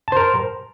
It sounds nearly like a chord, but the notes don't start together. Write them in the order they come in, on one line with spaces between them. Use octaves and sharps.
A5 C5 A#4